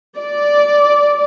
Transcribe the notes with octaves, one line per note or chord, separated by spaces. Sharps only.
D5